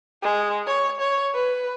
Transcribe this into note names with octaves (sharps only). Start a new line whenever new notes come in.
G#3
C#5
C#5
B4